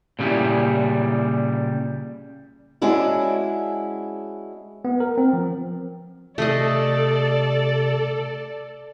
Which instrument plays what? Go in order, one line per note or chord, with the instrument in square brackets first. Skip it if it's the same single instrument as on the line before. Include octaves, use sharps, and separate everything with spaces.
[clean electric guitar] A#2 C#3 G3 E4
[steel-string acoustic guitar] G#3 C#4 D4 E4 F#4
[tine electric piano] B3
A#4
C4
F3
[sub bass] C3 [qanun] A3 G#4 D#5 [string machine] A4 [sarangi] D5